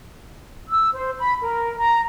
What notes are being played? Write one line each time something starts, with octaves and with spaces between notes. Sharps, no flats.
E6
C5
B5
A#4
A#5